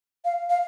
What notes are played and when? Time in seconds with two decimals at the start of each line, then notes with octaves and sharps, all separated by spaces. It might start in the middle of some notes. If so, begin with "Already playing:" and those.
0.25 F5
0.50 F5